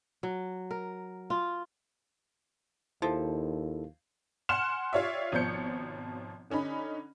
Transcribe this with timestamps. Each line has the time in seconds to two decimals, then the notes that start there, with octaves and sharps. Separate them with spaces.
0.23 F#3
0.71 A#4
1.30 F4
3.02 D#2 F3 E4 A4
4.49 F#5 G#5 C6 F6 F#6 E7
4.93 F4 G4 C#5 D5 E5
5.32 G#1 B2 F3 C#5 G6 C#7
6.50 D3 C#4 D#4 B5